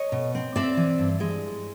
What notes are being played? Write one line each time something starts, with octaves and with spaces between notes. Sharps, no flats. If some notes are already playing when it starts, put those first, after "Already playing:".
Already playing: C#5 D#5
B2
C4
C4 D5 E5
E3
G2
G#3